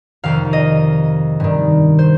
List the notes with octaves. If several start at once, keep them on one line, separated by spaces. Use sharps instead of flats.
F2 C3 D#3 F5
D#5
G2 D#3
C5